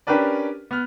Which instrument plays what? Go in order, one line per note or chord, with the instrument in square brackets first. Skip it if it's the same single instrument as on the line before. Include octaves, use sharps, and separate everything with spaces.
[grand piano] C#4 D4 G4 A#4 B4 D5
B3 F6